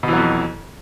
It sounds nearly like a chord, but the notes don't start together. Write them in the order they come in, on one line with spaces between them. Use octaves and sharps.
B2 E3 F#3 F2